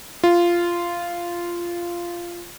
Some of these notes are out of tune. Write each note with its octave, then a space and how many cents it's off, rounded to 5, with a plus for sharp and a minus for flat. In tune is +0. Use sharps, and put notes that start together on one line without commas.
F4 -10